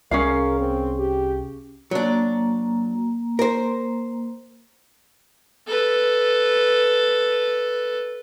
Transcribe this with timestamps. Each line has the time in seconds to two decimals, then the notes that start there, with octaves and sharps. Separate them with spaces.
0.11 C2 C#4 G#4 A#4 F5
0.59 C4
0.98 G4
1.91 F#3 A#3 D4 A#5
3.39 A#4 C5
5.67 A4 B4